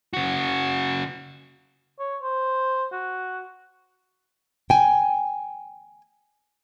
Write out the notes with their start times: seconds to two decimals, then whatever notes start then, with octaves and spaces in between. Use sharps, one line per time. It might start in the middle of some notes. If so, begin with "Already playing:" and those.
0.13 C#3 F#4
1.99 C#5
2.23 C5
2.92 F#4
4.70 G5 G#5